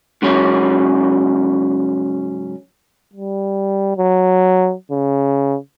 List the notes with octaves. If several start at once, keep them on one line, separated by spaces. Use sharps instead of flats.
G#2 C#3 F#3 C#4
G3
F#3
C#3